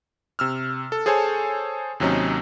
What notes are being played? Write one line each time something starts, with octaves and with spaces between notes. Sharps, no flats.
C3 E6 F6
A4
G#4 A4 C5 C#5 G#5 A5
D#2 C3 F#3 C#4 D#4